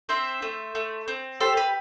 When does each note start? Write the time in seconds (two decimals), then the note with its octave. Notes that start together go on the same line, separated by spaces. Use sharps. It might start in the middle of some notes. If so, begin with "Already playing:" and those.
0.09 C4 C5 E5
0.42 A3
0.75 A3
1.08 C4
1.40 G4 A4 C5
1.57 B4